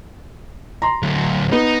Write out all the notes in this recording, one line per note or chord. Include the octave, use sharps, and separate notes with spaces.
A#5 C6
D2 F#3
B3 D#4